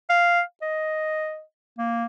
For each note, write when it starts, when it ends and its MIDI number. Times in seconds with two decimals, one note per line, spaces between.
0.10 0.41 77
0.62 1.42 75
1.78 2.06 58